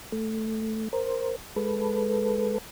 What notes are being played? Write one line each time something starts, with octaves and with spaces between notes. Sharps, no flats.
A3
A#4 C5
G#3 A4 B4